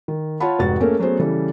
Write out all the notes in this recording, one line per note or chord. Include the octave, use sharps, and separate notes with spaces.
D#3
F4 C#5 F#5 A5 B5
F1 G#2 F#4 A6
A3 A#3 C#4 G#4 A#4
F#3 A3 B3 C#4 G#4 C5
C#3 E3 G3 A4